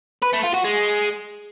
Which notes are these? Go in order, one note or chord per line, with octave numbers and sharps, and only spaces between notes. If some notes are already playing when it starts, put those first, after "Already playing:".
B4
A3
F4
F#4
G#3